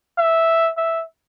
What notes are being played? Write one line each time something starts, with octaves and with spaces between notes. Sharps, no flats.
E5
E5